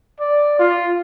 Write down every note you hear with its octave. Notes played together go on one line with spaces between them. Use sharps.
D5
F4